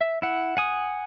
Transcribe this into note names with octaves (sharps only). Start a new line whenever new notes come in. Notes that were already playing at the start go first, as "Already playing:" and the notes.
E5
E4 F#5
F#5 G#5 D#6